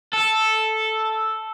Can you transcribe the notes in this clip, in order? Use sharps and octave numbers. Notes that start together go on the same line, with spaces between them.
A4